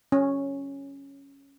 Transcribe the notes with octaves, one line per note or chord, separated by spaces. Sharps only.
C#4